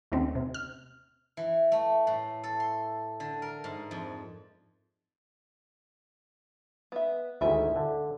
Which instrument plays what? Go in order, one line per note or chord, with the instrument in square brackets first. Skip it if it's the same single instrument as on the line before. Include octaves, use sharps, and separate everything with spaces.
[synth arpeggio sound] D#2 D#3 A3 C4 C#4
C3
F6
[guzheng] E3
A3
A2
A4
C6
D3
A#4
G#2
F2
[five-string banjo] B3 E5
[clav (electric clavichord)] D2 G#2 D#3 [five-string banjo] E4 E5 G#5
[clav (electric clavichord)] D3